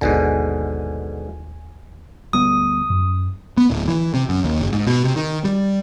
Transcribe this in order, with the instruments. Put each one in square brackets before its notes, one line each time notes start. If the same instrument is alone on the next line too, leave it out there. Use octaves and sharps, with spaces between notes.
[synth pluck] G#1 D#2 G#5 [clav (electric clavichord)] G#2 B2 D3
[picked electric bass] D2 G3 B3 [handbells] D#6
[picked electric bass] F#2
B3
D1
E3
C3
F#2
D#2
F#1
G#2
B2
C3
D#3
G3